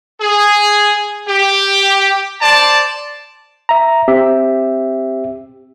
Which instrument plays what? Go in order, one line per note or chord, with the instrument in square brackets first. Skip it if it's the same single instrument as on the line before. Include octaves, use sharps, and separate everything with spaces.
[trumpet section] G#4
G4
C5 D5 A5
[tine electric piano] E5 A#5
C4 G4 E5